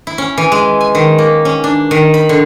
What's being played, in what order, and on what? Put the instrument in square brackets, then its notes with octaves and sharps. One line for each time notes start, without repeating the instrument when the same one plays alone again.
[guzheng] E4
C#4
E3
G#3
G#5
D#3
A#3
C#4
D4
D#3
B5
D3